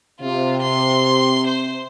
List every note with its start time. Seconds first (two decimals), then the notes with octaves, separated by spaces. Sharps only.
0.21 C3 F4
0.62 C6
1.46 C5